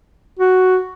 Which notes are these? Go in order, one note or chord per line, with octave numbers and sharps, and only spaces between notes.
F#4